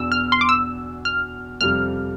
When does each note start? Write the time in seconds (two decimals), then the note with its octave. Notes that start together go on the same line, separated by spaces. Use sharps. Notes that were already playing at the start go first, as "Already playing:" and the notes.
Already playing: E2 B2 B3 D4 E6
0.12 F6
0.32 C6
0.41 D6
0.49 E6
1.05 F6
1.61 F2 C3 G3 F6